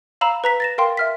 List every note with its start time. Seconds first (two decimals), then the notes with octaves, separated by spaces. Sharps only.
0.21 F5 A#5 B5 E6 E7
0.44 B4 A#5 B6
0.60 A6 A#6 E7
0.78 A#4 F5 G5 C6
0.97 E5 F6 B6